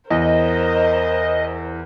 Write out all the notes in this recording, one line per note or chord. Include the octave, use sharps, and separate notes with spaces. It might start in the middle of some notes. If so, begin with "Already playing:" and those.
E2 A#4 C5 D#5